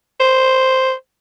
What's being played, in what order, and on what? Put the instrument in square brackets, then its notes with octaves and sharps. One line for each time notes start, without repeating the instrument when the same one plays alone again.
[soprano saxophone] C5